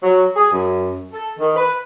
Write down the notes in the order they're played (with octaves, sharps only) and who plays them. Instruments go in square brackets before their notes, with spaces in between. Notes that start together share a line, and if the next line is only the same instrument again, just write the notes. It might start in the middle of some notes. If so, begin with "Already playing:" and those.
[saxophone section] F#3
G#4
F#2
A4
D#3
B4